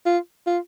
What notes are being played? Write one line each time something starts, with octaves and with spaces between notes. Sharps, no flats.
F4
F4